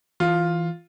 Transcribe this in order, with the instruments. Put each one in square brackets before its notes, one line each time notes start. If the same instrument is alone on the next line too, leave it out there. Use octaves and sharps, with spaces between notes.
[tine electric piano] E3 [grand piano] F4